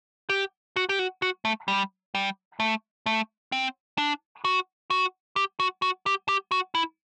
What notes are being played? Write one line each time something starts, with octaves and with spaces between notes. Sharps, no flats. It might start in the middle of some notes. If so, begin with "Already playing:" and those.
G4
F#4
G4
F#4
F#4
A3
G3
G3
A3
A3
C4
D4
F#4
F#4
G4
F#4
F#4
G4
G4
F#4
E4